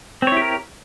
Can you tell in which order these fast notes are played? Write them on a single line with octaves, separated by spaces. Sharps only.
C4 C#5 E4 G4 A#4